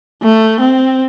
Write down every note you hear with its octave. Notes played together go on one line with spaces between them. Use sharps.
A3
C4